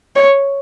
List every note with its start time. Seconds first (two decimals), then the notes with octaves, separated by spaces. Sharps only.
0.16 C#5